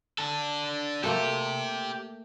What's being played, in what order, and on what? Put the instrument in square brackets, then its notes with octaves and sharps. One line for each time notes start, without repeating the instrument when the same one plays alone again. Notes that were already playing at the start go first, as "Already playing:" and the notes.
[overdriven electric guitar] D4 A4
[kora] A3 A#3 A4 [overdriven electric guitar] G4 C5